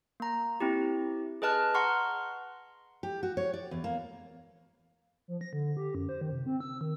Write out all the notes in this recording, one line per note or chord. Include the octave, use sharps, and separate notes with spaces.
A#3 A#5
C4 E4 G4
G#4 B4 D#5 A5 F6 F#6
F#5 A#5 C6 C#6 F6
G4
F#4
C#5
D5
E2
A#3
F3
A#6
D3
G4
F#2
C5
D#3
C3
C4
E6
D#3